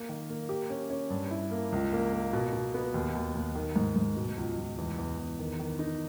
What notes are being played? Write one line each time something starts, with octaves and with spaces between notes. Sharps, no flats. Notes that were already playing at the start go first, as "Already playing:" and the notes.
Already playing: A#3
D#3
A#3
G4
C#4
C#4
G2
E4
A#3
C#2
A#3
A#3
B2
B2
B3
D#2
D#2
D#2
D#3
G#2
G#2
B2
C#2
C#2
E2
E2
E2
D#3
D#3
D#4